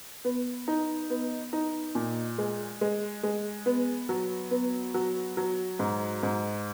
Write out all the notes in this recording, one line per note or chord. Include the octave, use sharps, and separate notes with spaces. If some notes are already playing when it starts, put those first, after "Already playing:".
B3
D#4
B3
D#4
A#2
G#3
G#3
G#3
B3
F#3
B3
F#3
F#3
G#2
G#2